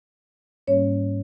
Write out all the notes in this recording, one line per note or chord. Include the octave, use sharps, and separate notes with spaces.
G#2 G3 A#3 C#4 C#5